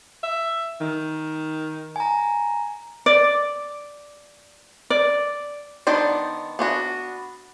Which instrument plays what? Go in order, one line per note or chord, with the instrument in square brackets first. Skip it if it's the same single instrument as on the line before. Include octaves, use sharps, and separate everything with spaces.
[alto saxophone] E5
D#3
[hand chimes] G#5 A#5
[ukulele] D5
D5
[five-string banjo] D#3 B3 D4 C5 D5
B3 D4 F#4